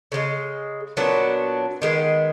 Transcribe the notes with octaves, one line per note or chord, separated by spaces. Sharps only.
C#3 F3 G#3
A#2 F#3 B3 D4
D#3 G#3 B3